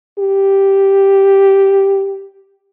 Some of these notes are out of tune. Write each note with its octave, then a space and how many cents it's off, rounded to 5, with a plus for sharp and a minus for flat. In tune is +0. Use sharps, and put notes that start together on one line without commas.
G4 -5